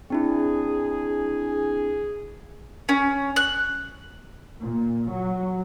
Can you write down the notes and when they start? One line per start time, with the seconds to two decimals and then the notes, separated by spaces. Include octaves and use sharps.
0.10 C4 D4 E4 G#4
2.89 C#4
3.36 F#6
4.63 A#2
5.12 F#3